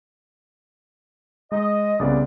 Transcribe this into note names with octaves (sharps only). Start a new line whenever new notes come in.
G#3 D#5
C2 C#3 B3 D5